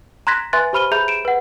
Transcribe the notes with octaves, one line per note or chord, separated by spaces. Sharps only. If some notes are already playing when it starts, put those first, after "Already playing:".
A#5 C6 F#6 G#6 A#6 B6
B4 E5 G#5 C6 F#6 A6
G4 C5 B5 F6 D#7 G7
G#4 E5 A#5 B5 G6 F7
D7 E7
B4 F#5